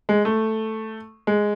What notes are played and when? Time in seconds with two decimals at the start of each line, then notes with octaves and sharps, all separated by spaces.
0.09 G#3
0.25 A3
1.27 G#3